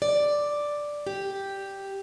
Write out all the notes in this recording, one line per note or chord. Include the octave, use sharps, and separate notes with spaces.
D5
G4